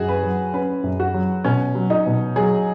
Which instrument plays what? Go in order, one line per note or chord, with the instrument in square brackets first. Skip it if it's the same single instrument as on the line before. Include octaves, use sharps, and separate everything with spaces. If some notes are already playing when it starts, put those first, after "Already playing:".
Already playing: [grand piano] F#2 [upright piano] F#4 G#4
[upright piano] B4
[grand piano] F#3
[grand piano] C#4 [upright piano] B4
[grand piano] F#2
[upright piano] F#4
[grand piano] F#3
[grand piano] B2 [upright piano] C#4
[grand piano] F#3
[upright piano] D#4
[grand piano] B2
[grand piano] F#3 [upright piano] G#4